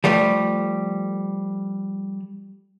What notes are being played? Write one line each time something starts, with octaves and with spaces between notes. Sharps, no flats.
F3 G3 A3